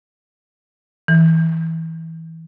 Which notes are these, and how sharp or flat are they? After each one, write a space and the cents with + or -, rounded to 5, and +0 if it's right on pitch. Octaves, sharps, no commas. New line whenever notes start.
E3 -20